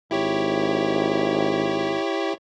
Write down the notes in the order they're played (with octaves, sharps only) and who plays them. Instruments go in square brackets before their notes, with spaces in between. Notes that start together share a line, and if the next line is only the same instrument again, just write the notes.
[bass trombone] G#1 [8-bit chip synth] E4 G4 C#5